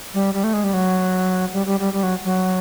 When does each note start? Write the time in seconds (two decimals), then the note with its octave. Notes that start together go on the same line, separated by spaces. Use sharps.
0.14 G3
0.34 G3
0.44 A3
0.53 G#3
0.64 G3
0.73 F#3
1.53 G3
1.66 G3
1.80 G3
1.93 G3
2.03 F#3
2.24 F#3